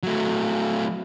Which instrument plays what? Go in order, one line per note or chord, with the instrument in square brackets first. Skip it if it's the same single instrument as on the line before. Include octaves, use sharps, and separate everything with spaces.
[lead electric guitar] F#3 A3